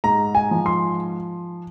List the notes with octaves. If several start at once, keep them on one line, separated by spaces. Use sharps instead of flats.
G#2 A#5
G#5
F3
C6